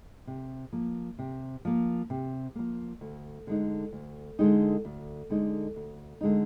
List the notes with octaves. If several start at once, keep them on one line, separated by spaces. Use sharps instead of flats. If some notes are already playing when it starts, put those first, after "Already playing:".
C3
F3 A#3
C3
F3 A#3
C3
F3 A#3
D2
D3 G#3 D#4
D2
D3 G#3 D#4
D2
D3 G#3 D#4
D2
D3 G#3 D#4